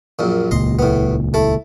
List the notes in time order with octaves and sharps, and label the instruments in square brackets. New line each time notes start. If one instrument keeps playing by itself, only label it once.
[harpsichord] A#1 F#2 A#2
[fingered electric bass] D#1 C#2 A#2 [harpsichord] D#5 C6
[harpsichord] A2 B3
A3 E4 A4